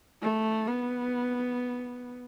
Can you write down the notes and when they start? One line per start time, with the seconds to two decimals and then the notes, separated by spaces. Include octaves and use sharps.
0.22 A3
0.68 B3